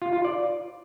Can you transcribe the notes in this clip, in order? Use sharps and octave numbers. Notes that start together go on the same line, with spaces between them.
F4
F4
D5